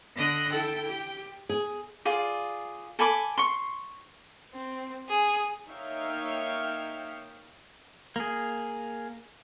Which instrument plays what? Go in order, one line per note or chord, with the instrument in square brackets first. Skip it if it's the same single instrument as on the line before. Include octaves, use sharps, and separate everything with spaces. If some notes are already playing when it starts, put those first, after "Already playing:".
[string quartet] D3 D#5 F#6
[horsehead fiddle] E4 A4 [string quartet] G5
[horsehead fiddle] G4
[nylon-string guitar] G#4
[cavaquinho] F4 G#4 D5
A4 G#5 B5 D6
C6 C#6
[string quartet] C4
G#4
[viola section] A#3 D#4 C#5 E5 F5 G5
[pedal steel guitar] A#3 G#4